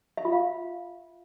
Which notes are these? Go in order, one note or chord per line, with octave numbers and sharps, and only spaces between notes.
E5
F4
F5